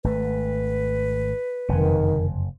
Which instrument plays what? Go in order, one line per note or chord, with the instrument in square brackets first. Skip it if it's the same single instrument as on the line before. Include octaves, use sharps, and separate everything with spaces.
[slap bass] G#1 A3 [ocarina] B4
[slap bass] F#1 [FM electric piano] F2 C3 [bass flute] D#3